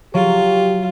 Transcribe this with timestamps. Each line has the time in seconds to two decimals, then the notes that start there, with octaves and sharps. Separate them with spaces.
0.14 F#3 F4 G4